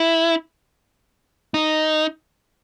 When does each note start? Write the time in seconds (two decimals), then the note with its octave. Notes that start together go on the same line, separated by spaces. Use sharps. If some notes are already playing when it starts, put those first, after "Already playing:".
Already playing: E4
1.54 D#4